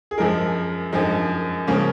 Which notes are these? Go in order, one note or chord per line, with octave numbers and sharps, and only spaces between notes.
G#4
F#2 F3 G#3 A#4
F#2 F3 G#3 D#4
C#3 F3 A#3 C#4